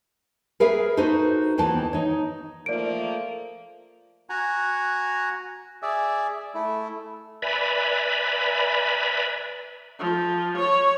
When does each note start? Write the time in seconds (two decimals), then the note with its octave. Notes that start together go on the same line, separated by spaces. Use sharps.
0.60 G#4 A#4 B4 E5 F5
0.97 D#4 F#4 A4 B4 C5
1.58 D#2 D#3 E3 B3 A5
1.93 D#4 C#5
2.66 F3 A3 A#3 D5 D7
4.30 F#4 F#5 G#5 A#5
5.83 G#4 D5 E5
6.55 A3 E4
7.42 B4 D5 E5 G#5 A#5 B5
9.99 F3
10.57 C#5